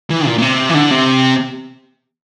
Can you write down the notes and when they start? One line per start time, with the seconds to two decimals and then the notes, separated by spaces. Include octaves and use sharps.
0.10 E3
0.27 A#2
0.39 A#2
0.42 C3
0.70 E3
0.75 D3
0.91 C3